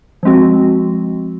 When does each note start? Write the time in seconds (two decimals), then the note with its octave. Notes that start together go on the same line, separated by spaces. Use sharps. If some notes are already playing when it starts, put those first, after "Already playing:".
0.23 F3 G#3 C4 F#4